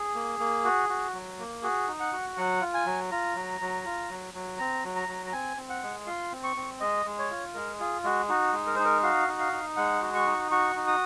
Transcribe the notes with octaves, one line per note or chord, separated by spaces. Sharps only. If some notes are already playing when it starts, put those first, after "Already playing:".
Already playing: G#4
A#3
A#3
F#4
F#4
F#3
A#3
F#4 G#4
D#4
F#5
F#4
F#3 F#5
F4
G#5
F#3
F4 A#5
F#3
F#3
F4
F#3
F#3
C4 A#5
F#3
A#5
F#3
A#5
C4 G#5
C4
F#5
G#3
F4 C6
C4
C#6
C4
G#3 D#5
G#3
C#5
F4
G#3 A#4
F4 G#4
G#3 F#4
D#4 F#4
G#3
A#4
D#4 C5
A#4
F#4 F5
D#4
F5
D#4
G#3 F#5
F#4
C#6
D#4
F#4 C#6
D#4
D#6